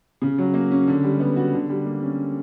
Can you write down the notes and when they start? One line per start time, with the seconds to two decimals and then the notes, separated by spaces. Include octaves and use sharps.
0.22 C#3
0.38 F#3
0.54 A#3
0.71 C#4
0.87 D3
1.04 G3
1.20 B3
1.36 F#4
1.53 D3
1.69 G3
1.86 A#3
2.03 C#4